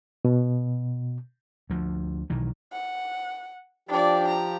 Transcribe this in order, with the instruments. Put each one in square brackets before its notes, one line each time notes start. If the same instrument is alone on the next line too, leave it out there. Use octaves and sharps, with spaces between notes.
[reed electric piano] B2
[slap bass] D2 F3
B1 D#3 E3
[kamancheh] F#5
[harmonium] F3 G4 [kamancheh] D4 D5
[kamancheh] A#5